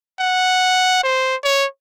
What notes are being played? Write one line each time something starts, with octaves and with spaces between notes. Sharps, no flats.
F#5
C5
C#5